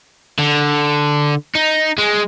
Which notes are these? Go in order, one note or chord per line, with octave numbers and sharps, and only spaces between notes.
D3
D#4
G#3